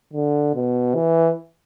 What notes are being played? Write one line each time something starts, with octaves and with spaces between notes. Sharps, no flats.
D3
B2
E3